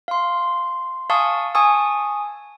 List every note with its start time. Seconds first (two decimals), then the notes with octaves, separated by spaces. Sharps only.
0.08 F5 C6
1.10 F5 G#5 A5 C#6 D#6
1.55 G#5 A5 C#6 D#6 E6